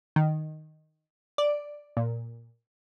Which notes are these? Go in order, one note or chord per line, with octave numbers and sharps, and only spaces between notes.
D#3
D5
A#2